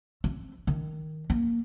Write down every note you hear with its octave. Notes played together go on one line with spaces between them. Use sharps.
C4
D#3
A#3